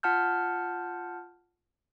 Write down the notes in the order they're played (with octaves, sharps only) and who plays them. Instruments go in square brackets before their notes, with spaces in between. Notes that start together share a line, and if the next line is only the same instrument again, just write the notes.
[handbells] F4 F#5 A5 F6 G6